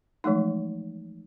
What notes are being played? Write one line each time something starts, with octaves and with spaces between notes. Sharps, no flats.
E3 F3 G#3 A3 D#4